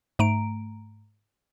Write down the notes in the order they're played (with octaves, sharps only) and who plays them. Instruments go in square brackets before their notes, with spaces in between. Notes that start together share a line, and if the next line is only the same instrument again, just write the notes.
[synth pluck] G#2 A3 A#5 D7